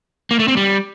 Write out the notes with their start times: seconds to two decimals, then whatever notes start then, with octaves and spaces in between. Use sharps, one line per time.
0.31 A#3
0.39 A3
0.48 C4
0.57 G3